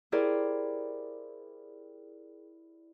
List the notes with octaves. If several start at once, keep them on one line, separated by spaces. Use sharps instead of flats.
E4 G4 G#4 A#4 C5 D5